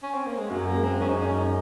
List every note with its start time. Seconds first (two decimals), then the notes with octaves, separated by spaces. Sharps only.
0.03 C#4
0.14 C4
0.26 A#3
0.38 G#3
0.50 F#2 F#3
0.67 A#3
0.76 G#3
0.84 C4
1.00 F#2 C#4
1.09 D#4
1.17 C#4
1.25 F#2
1.34 D#4